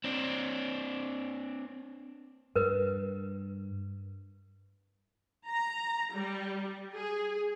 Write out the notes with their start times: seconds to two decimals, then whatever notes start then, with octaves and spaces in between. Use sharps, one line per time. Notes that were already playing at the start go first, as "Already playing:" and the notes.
0.04 C4 D4
2.56 G2 A#4 B4
5.47 A#5
6.13 G3
6.93 G#4